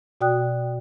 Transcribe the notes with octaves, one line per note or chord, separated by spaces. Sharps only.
B2 F#4 D5 G5 D#6 F#6